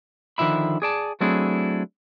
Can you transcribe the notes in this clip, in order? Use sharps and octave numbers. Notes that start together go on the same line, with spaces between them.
D3 D#3 F3 E5 B5
G#4 D5 A5
F#3 A3 C4 D4 E4 G#4